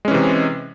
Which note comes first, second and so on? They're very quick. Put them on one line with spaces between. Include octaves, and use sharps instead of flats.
G#3 C#4 E3 C3